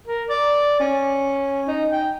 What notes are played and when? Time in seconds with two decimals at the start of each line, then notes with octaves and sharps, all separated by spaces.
0.08 A#4
0.30 D5
0.80 C#4
1.68 D#4
1.92 G5